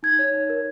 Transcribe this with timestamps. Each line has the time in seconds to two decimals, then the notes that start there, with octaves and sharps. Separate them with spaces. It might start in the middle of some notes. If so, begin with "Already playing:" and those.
0.03 D#4 G#6
0.19 C#5
0.34 D#4
0.49 A#4